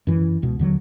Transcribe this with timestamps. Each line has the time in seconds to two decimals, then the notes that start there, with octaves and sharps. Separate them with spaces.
0.07 F#2 E3
0.42 C#2 B2
0.59 D#2 D3 F#3